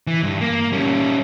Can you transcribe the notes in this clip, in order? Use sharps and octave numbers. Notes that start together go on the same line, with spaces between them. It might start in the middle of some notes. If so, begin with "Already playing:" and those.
E3
G2
A#3
G3 C#4